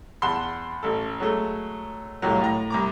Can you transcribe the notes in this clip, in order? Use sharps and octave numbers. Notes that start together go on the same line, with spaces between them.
E2 F#5 A5 B5 C6
A1 A4
F#3 G#3 A3
C2 F2 A2 F#3
A2 A#5
C2 A#5 D6